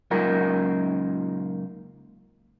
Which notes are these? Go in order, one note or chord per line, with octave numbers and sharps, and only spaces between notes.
C#2 F#2 A#2 D#4 F4 A#4